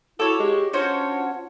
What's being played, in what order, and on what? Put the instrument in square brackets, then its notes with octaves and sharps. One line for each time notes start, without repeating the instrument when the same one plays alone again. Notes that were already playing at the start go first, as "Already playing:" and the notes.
[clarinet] E4 [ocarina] F#4 [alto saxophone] A4 [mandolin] C#5 D6
[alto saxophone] G#3 [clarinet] G4
[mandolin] C#4 F#4 C5 [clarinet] D4 [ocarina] F4 [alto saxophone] C#5